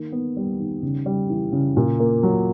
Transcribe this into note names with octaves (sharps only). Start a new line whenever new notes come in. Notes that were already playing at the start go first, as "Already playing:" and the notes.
Already playing: D#3 A#3
B3
G3
D#3
C#3
G3
E3
C#3
A#2
A#3
F#3